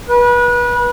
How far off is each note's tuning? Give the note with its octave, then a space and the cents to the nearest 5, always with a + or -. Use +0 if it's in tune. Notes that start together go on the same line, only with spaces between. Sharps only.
B4 -30